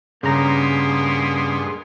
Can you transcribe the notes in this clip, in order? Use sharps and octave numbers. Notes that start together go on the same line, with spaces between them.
G2 C#3 A#3 B3 G#4 A#5 C6